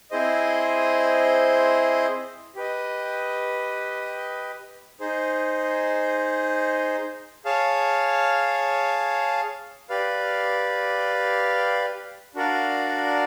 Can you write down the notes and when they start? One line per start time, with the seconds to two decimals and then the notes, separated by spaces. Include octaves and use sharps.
0.11 C4 E4 G#4 C5 D#5
2.55 G4 B4 D#5
5.00 D#4 G#4 C5
7.45 G#4 C#5 F5 A5
9.90 G4 B4 D5 F5
12.35 D4 F#4 A#4 D5 F5